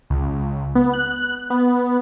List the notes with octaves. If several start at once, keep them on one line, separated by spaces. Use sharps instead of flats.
C#2
B3
F#6
B3